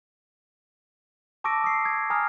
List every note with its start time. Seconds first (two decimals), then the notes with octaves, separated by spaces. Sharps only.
1.44 A5 C#6 D6 E6 A#6 D7
1.64 D#6 C7
1.85 G#6
2.10 G#5 A#5 D#6 F6